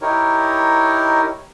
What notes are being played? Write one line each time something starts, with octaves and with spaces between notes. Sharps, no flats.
D#4 E4 G4 A#4 C#5